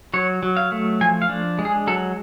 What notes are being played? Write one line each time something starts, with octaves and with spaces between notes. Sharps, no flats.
F#3 C#5
F#3
F5
A3
F3 G#5
F5
D4
G#3
G#4
F#3 A4